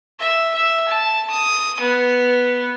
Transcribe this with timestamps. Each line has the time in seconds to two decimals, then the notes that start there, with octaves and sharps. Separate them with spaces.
0.19 E5
0.54 E5
0.88 A5
1.30 D#6
1.80 B3